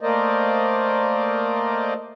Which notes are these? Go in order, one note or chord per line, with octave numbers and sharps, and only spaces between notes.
A3 A#3 A#4 C5 D5 D#5